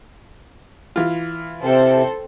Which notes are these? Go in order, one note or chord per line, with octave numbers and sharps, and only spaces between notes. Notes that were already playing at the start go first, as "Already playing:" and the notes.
E3 F4
C3 C4 A4 C5